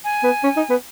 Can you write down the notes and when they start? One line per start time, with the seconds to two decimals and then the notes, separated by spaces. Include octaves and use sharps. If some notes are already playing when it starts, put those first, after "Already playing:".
0.04 G#5
0.24 B3
0.44 C#4
0.57 D#4
0.70 B3